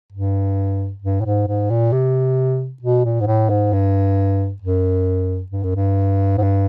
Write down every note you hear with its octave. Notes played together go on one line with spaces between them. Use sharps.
G2
G2
A2
G#2
G#2
A#2
C3
B2
A#2
G#2
A2
G#2
G2
F#2
G2
F#2
G2
G#2
G2